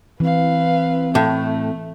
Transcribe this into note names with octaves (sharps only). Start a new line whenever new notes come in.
E3 C4 B4 F5
A2 A3